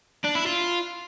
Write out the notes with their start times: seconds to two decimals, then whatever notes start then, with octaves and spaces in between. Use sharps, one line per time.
0.25 D4
0.35 E4
0.46 F4